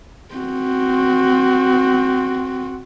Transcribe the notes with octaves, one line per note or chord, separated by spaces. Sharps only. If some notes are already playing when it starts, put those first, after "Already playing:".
C4 F#4